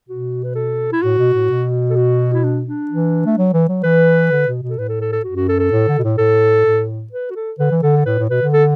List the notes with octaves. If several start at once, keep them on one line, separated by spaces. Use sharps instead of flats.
B2 F#4
B4
A4
E4
A2 F#4
B2
A2
B2
A4
F#4
E4
D4
D4
E3
A3
F#3
E3
F#3
E3 B4
D3
B2
B2
A4
A2 B4
A4
A4
A4
F#2 F#4
F#4
A4
A4
A2
D3
B2
A2
A2 A4
A2
B4
F#4
A4
D3 B4
E3
D3 A4
A4
A2 B4
A2
B2 B4
D3
A4